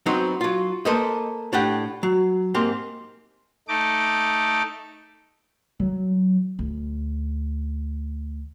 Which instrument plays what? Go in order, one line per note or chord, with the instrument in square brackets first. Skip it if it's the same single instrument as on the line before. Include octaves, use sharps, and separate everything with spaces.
[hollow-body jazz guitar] F#3 B3 C4 D#4 C5
F#3 F4
A#3 A4 B4 C5 D#5
A2 D4 G4 F#5 G5
F#3
G#2 A#3 C4 G4 C6
[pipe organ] A3 D#4 D6
[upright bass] F#3
D2